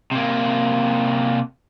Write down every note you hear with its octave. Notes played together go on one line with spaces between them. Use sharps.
C3 A#3